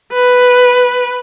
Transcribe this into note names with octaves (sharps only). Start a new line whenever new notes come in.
B4